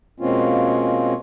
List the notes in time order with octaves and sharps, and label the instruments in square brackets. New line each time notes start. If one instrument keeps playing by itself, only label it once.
[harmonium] B2 G#3 A#3 C4 C#4 F4